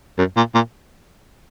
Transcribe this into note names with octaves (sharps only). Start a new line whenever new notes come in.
F#2
A#2
A#2